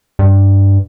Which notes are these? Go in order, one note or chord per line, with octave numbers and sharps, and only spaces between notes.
G2